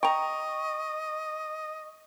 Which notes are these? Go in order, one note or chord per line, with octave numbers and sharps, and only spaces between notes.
D#5 G5 A#5 C#6